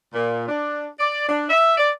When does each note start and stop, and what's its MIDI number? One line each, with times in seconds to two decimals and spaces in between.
0.14 0.44 46
0.48 0.87 62
1.00 1.27 74
1.29 1.44 62
1.50 1.73 76
1.77 1.91 74